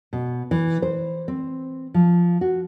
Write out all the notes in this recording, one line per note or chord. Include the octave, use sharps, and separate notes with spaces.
B2
E3
C5
C4
F3
F#4